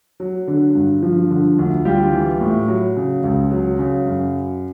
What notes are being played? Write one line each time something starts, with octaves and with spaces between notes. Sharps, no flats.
F#3
D3
G2
F3
D3
D2
G3 F4 G4
E3
A2
F#3
C#3
C#2
F#3
C#3
F#2